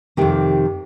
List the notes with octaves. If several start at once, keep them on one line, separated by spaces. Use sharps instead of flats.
F2 C3 D#3 G4